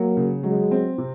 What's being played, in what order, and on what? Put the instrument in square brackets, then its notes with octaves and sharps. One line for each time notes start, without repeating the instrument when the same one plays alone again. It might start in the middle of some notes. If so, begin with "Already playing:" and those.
Already playing: [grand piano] F#3 [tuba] A#3
[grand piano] C#3
[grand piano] F#3 [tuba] G#3
[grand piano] C4
C3